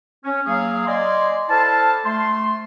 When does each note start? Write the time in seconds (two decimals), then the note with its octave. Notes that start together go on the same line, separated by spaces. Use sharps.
0.25 C#4
0.46 F#3 A#3 G#4 F5
0.87 D5 D#5 G#5 C6
1.49 E4 A4 C5 D5 F5 A5
2.05 A3 C6